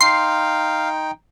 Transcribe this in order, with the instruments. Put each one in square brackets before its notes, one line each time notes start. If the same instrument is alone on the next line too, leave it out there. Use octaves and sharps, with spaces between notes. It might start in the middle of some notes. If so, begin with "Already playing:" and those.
[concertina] D#4 G5 [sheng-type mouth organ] F5 [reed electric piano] C6 [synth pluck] C7